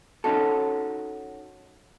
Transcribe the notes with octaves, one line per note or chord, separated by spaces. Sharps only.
C#4 D#4 F#4 A4